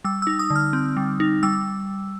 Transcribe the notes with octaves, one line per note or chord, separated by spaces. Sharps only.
G3 E6
D#4 E6
D#6
D3
F6
C4
G3
D#4
G3 E6